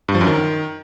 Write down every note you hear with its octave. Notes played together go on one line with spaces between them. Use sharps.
G2
F3
F#2
D#3